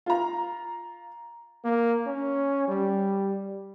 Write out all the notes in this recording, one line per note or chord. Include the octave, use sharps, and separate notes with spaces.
F4 A#5
A#3
C#4
G3